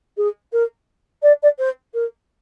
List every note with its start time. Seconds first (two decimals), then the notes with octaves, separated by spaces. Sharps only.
0.17 G#4
0.52 A#4
1.22 D5
1.42 D5
1.58 C5
1.94 A#4